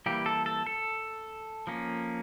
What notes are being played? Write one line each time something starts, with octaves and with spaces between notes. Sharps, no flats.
E3 G3 A#3 G4
A4
A4
A4
F3 A#3 C#4